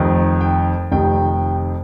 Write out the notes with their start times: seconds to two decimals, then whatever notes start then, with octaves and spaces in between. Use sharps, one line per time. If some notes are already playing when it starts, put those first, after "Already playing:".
Already playing: F1 F2 D#3
0.41 G5
0.91 F1 F2 C3 D#3 G5